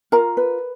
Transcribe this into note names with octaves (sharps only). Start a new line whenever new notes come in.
F4 A#4 A#5
B4